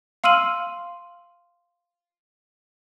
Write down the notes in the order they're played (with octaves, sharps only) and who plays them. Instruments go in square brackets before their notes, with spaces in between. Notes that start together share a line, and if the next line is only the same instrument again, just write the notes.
[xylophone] F5 C6 E6 F6 D#7 F#7